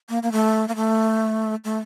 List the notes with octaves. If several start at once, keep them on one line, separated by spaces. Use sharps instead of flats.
A#3
A#3
A3
A#3
A3
A3